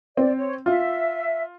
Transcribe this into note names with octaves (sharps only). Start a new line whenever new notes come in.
C4 D5
C#5
F4 E5